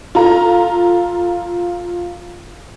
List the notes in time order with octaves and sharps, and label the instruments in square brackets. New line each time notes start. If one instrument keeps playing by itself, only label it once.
[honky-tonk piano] F4 A4 A#5